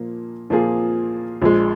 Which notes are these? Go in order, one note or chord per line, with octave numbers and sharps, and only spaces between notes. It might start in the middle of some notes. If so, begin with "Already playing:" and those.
Already playing: A#2 F3 A#3
A#2 F3 A#3 F4 G#4
A#1 A#2 G#3